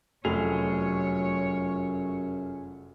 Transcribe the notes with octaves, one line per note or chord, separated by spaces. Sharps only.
F1 F#2 F#3 A3 F4 G#4 C#5 F7